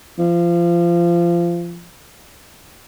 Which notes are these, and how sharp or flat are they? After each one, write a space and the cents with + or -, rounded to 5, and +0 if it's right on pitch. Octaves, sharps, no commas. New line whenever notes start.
F3 -25